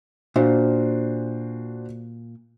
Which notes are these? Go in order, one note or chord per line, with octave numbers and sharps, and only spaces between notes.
A#2 D4 F#4 C5